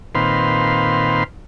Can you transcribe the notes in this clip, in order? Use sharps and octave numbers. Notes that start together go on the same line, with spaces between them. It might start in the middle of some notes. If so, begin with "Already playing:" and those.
A#2 D#3 C4 B4 F5 C6